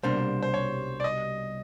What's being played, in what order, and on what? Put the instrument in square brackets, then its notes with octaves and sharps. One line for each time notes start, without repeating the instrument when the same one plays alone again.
[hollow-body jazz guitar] C2 B2 G3 A#3 D4 [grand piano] C5
[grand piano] C5
C#5
D5
D#5